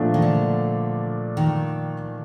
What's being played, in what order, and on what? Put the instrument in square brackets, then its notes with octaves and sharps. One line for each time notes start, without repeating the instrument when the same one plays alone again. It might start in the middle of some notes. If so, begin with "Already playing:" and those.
Already playing: [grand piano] A#2 F3 A3 D4
[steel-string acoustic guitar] D#3
D3
D#3